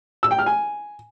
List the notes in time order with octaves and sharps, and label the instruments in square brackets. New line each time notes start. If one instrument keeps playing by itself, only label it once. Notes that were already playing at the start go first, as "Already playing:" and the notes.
[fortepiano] E6
G5
F6
G#5